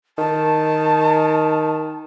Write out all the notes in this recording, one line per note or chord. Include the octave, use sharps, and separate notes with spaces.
D#3 A5